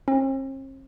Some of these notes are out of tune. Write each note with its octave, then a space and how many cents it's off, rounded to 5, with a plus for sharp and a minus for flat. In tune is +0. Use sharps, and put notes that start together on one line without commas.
C4 +45